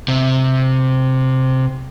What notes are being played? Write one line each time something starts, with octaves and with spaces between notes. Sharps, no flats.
C3